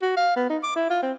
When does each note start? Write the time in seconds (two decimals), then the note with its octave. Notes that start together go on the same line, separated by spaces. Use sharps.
0.02 F#4
0.17 F5
0.36 B3
0.50 D#4
0.63 D6
0.76 E4
0.90 F4
1.03 C4